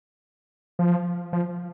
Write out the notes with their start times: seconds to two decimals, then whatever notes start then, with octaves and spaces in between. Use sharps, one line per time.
0.79 F3
1.33 F3